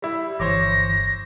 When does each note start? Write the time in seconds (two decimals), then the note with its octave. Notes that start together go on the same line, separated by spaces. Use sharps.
0.02 G3 E4
0.40 G1 E3 C5 C#5 D6 A#6